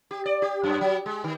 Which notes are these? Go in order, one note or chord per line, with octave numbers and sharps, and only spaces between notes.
G4
D5
G4
F#2
F#3
G#3
D#3